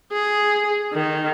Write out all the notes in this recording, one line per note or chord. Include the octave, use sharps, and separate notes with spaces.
G#4
D#3